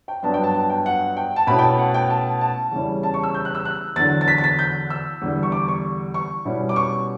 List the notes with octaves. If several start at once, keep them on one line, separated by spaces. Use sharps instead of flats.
G5
G2 F#3 B3 D4 A5
G5
A5
A5
G5
F#5
G5
A5
B2 A3 C#4 E4 B5
G5
A5
F#5
G5
A5
A5
E2 C#3 G3 C#4 E4
A5
C#6
E6
G6
F#6
E6
F#6
E2 D3 F#3 A6
A6
B6
A6
B6
G6
E6
E2 D3 G3
C#6
D6
C#6
C#6
B2 G3 C#4 E4
D6
C#6